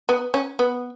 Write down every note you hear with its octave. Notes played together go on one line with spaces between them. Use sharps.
B3
C#4
B3